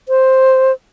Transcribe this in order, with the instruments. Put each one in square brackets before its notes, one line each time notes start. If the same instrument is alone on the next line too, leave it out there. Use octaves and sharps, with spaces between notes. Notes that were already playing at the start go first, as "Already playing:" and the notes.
[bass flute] C5